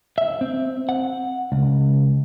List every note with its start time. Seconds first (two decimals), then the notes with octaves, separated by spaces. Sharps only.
0.18 E5
0.41 C4
0.89 F#5
1.52 C#2